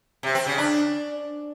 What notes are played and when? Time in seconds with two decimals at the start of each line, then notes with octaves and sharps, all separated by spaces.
0.23 C3
0.35 C4
0.46 C#3
0.58 D4